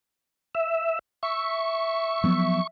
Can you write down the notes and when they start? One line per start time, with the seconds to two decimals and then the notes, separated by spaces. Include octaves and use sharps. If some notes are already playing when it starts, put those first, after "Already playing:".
0.55 E5
1.23 E5 C#6
2.24 F3 F#3 B3